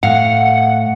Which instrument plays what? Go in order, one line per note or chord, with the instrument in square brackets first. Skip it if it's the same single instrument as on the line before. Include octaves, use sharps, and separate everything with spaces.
[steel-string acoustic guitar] A2 F5 [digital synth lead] F#5